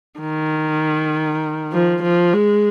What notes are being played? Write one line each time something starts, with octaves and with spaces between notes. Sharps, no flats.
D#3
F3
F3
G#3